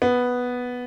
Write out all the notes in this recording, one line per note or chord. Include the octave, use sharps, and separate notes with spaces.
B3